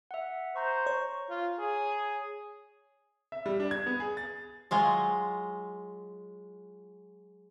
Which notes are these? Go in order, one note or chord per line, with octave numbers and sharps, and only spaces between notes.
E5 F#5
C5 A#5 C#6
C#5
F4
G#4
E5
G3
D4
G#6
B3
G#4
A6
F#3 G#3 F4